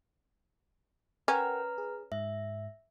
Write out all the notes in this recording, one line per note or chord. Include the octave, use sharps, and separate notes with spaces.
C#4 A#4 B4 F#5 G5 A#5 F6
G#4
G#2 E5